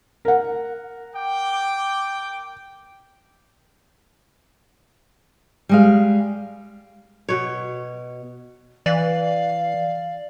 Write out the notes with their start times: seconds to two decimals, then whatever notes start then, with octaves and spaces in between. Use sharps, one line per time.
0.25 A#4 F#5
1.16 G5 D6
5.69 G3 G#3 F5
7.29 B2 C#5
8.86 E3 D5 F5